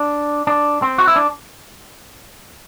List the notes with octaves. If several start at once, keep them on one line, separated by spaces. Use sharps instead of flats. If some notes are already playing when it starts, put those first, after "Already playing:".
Already playing: D4
D4
C4
F#4
E4
D4